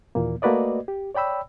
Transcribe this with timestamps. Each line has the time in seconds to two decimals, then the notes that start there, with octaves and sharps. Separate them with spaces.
0.15 D#2 A#2 E3 A#3
0.42 A3 A#3 F#4 B4 D5 D#5
0.88 G4
1.15 C#5 D5 G5 B5 E6